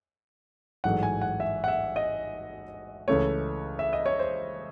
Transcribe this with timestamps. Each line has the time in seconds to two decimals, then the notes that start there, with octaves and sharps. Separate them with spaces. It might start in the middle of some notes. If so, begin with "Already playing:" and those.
0.84 A1 G#2 F#3 A3 F#5
1.03 G#5
1.21 F#5
1.40 E5
1.64 F#5
1.68 E5
1.96 D#5
3.08 C#2 C#3 E3 A3 C#4 C#5
3.79 E5
3.93 D#5
4.06 C#5
4.19 C5